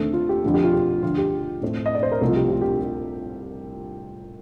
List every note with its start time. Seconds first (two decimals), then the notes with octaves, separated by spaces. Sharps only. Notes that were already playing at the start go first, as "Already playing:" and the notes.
Already playing: D#2 D3 A3 C4 A4
0.13 F4
0.29 G4
0.43 F2 D3 A3 F4
0.54 G4
0.64 F4
0.73 G4
1.02 D2 D3 F3 F4
1.18 G4
1.61 A2 A3 C4
1.86 D#5
1.95 D5
2.03 C5
2.12 A#4
2.21 C2 C3 F3 A3 A4
2.28 F4
2.36 G4
2.47 G4
2.51 F4
2.61 G4